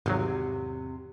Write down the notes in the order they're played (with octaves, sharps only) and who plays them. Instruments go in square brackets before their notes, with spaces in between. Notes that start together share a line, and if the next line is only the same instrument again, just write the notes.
[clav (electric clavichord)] G#1 F#3 [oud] E2 C3